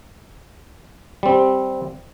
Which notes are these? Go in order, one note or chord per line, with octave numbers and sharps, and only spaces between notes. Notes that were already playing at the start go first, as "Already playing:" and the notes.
G3 C4